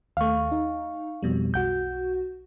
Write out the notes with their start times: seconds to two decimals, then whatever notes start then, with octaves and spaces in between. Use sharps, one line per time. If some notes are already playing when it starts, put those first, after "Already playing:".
0.17 D#2 A3 F5 C#6
0.52 D#4
1.23 F2 B2 G3
1.54 B1 F#4 F#5 G6